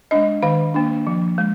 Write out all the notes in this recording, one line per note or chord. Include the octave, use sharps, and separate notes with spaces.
G#3 D4 D#5
D#3 F5
A#3 D4
F3
G#3